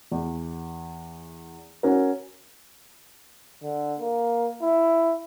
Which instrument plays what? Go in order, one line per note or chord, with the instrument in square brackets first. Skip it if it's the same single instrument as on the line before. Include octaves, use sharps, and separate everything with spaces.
[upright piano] E2
C#4 F#4 A#4
[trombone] D3
A#3
E4